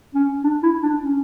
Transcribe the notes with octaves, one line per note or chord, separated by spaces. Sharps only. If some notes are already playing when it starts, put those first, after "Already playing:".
C#4
D4
E4
D4
C#4